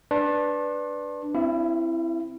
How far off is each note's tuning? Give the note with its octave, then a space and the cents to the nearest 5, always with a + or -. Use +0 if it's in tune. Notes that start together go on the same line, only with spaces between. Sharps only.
D4 +0 B4 +0 C6 +45
C4 +0 E4 +10 F5 -45